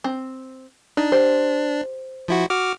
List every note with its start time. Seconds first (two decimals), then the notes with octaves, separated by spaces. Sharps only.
0.04 C4
0.97 D4 D#4
1.12 G4 C5
2.28 F3 E4 F#4
2.50 F#4 D6 F6